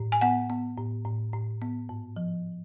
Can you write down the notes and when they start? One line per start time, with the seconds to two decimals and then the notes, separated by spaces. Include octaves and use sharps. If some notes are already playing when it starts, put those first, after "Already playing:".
Already playing: A2
0.12 G#5
0.21 B3 F#5
0.50 B3
0.78 A2
1.05 A2
1.33 A2
1.62 B3
1.89 G#2
2.16 F3